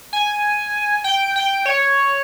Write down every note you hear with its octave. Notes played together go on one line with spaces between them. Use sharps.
G#5
G5
G5
C#5